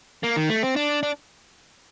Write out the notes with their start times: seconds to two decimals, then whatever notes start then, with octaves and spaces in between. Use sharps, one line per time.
0.23 A#3
0.36 D#3
0.49 A3
0.63 C4
0.76 D4
1.03 D4